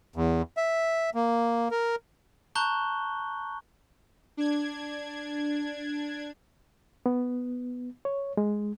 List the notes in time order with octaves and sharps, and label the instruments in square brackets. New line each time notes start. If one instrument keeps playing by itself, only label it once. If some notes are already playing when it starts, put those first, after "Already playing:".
[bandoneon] E2
E5
A#3
A#4
[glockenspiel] A5 A#5 C#6 F#6 G6 G7
[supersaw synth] D4 G#6
[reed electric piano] B3
C#5
G#3